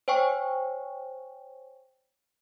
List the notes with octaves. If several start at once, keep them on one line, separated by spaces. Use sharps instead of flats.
C5 C#5 G5 G#5 C#6